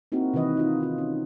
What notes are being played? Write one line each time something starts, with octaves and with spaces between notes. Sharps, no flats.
A#3 C4 D#4 E4 F#4 A#4
C3 D#3 E3 B4 D#5 E5
D#4 F4
D#3 F4
C#4